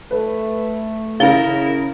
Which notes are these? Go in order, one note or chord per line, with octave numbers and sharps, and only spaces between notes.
A3 B4
C#3 E4 A#4 F5 A6 A#6 G7